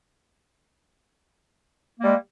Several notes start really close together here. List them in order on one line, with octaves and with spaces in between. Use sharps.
A#3 G3 G#3